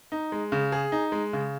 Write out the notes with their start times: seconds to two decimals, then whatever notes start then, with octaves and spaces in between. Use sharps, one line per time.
0.12 D#4
0.32 G#3
0.52 C#3
0.72 G#4
0.92 D#4
1.12 G#3
1.33 C#3